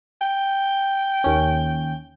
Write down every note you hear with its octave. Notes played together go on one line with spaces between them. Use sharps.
G5
D#2 C#4